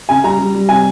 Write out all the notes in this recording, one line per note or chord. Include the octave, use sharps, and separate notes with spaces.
C#3 G#5
G3 A#5
G3
G3
C3 G#5